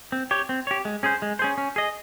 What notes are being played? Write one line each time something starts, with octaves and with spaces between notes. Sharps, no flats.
C4
G4 C#5
C4
G4 C#5
G#3
C#4 G#4 C5
G#3
C#4 G#4 C5
C#4
G#4 D#5